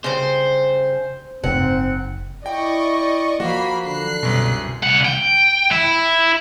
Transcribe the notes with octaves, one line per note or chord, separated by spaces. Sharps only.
G2 C#3 C5
F#1 G#2 C4 F#5
E4 D5 D#5 G5 C#6
F3 A#3 F#4 B5 C7
D3 F#6 C7
C2 F#2 B2
C2 F#5
G5
E4